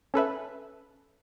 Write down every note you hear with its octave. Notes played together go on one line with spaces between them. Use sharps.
C#4 A4 B4 E5